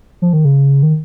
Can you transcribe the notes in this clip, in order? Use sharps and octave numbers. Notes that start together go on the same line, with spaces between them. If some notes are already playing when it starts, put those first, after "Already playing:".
F3
D#3
C#3
D#3